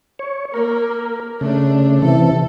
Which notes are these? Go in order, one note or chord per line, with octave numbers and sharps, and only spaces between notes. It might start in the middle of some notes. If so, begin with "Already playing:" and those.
C#5
A#3 A#4
C#3 A3 D4
C3 E3 A4